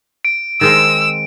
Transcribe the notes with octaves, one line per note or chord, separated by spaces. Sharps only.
D7
D#3 G#3 C4 E6